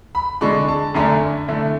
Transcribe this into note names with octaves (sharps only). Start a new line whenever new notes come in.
B5
D3 G#3 D4 C#6
A5
F#2 D3 A3 D4 G#5
D3 A3 E4